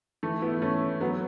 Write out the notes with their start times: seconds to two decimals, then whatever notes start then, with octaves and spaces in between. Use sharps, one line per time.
0.23 E3 A3
0.42 B3 E4
0.62 A3 C#4
1.01 F#3 B3
1.13 B3